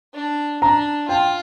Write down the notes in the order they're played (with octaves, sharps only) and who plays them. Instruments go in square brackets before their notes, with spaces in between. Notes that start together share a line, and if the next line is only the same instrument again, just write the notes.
[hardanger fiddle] D4
[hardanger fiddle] D4 [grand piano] A#5
[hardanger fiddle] F4 [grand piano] G5